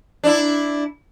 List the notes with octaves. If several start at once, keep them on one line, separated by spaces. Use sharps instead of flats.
D4 E4